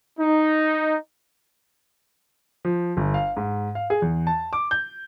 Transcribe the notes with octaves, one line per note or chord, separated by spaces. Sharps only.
D#4
F3
G1
F5
G#2
F5
G#4
E2
A5
D6
G6